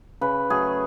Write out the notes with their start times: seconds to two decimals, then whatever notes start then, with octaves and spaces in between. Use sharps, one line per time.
0.21 C#3 B4
0.50 F#3 A3 G#4